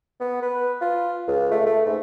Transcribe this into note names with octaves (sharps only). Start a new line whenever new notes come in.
B3
B4
F4
C#2
A3
A3
G#2